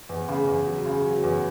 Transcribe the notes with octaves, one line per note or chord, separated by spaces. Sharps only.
E2
C#3
E2
F#3
C#3
F#3
E2